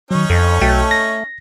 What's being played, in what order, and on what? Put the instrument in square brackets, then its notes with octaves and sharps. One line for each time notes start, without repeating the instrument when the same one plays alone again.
[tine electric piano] D#3 F#3 [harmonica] C#4 D#4 C#5
[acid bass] F2 [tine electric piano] A4
[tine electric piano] B1 F#4 G5 [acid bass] A3
[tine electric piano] A#6